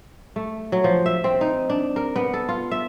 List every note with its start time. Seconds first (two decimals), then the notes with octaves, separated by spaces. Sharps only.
0.36 A3
0.72 F#3
0.84 F3
1.06 E5
1.24 C4
1.41 D#4
1.69 D4
1.96 A#4
2.16 B3
2.34 A4
2.49 F4
2.71 E5